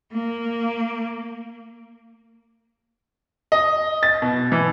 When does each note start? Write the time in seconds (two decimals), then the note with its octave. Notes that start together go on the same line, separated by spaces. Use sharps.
0.12 A#3
3.52 D#5
4.03 A6
4.22 B2
4.52 E3